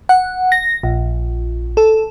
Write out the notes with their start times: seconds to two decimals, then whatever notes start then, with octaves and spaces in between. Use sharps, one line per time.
0.09 F#5
0.52 A#6
0.83 A#1
1.77 A4